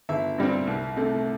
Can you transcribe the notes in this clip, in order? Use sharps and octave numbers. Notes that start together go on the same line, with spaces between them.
G1 E5
G2 G3 C4
C2
C3 A3